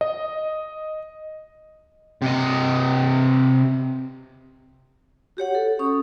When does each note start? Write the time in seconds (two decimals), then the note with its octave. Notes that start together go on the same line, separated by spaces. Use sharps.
0.01 D#5
2.22 C3 D#5
5.37 F#4 G4 C#5 F#5
5.55 A4
5.79 C#4 C#6 D#6